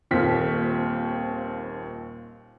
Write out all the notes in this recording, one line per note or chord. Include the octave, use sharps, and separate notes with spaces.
D#1 D#2 C4 F4 B6